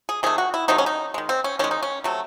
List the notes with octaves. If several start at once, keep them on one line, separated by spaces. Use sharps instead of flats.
G#4
C3 D#3 A3 G#4
F#4
E4
C3 D#3 F#3 A3 D#4
C#4
D#4
D#3 G#3
C4
C#4
D#3 G#3 C#4
D#4
C#4
C3 F#3 A3